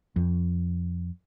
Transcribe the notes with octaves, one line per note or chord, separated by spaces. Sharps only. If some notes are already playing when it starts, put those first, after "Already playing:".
F2